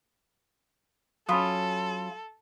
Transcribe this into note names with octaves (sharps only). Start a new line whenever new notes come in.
F#3 C#4 F4 A4 B5 D#6